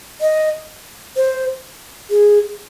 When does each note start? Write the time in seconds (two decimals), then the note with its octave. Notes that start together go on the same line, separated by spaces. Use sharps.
0.21 D#5
1.16 C5
2.10 G#4